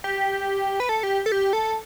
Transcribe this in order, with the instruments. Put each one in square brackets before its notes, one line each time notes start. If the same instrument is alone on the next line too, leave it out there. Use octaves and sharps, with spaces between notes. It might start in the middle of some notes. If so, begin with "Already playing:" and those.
[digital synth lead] G4
B4
A4
G4
A4
G4
A4